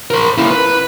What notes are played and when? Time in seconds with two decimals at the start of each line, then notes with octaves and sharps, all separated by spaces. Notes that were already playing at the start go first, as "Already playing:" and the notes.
0.11 A#4 C5
0.38 A#3 E4
0.51 B4